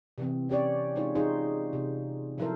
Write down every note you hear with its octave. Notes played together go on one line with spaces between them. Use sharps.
C3 E3 C4
C#4 G4 C#5 D5
G#3 D#4 F4 C5 C#5
D#4 F4 G#4 C5
C3
F3 F#3 E4 A4 A#4 C5